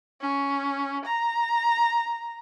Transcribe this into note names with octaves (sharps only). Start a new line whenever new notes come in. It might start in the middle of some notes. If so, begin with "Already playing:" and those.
C#4
A#5